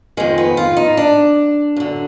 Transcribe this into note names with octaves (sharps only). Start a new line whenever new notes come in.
F2 D#3 G#3
B3
F4
D#4
D4
F#2 D3